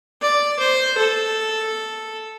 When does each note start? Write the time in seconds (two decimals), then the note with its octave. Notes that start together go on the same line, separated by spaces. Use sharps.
0.21 D5
0.59 C5
0.97 A4